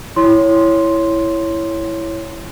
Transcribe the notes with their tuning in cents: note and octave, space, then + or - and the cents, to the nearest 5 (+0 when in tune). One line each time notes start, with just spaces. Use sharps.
E4 +5 C#5 +0 C6 +0